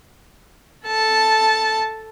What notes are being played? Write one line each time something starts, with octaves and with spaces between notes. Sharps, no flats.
A4 A5